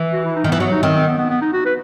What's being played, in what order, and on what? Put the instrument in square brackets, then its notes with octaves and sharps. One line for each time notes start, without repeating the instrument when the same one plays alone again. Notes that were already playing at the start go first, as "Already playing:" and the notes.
Already playing: [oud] E3
[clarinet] F#4
E4
D#4
[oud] D#3
[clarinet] B3
[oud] E3
[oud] F#3 [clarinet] B3
[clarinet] D#4
[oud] D#3 [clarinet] C4
[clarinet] C4
B3
B3
B3
D#4
F#4
B4